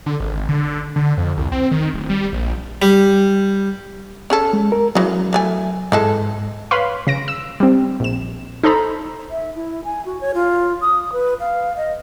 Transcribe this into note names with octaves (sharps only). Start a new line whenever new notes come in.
D3
G#1
D3
D3
F2
C2
C4
D#3
D1
G3
A#1
G3
C#4 G#4 A4
G#3
A#4
C#3 E3 F#3
E3 A3 G#5
G#2 E3 G#3 A4
B4 C#5 F5 B5 C6
C#3 A#6 D7
E6
G3 C4
A#1 E7
D#4 A4 C5 A#5 B5
E5
E4
G#5
F#4
C#5
F4
D#6
B4
F5
D#5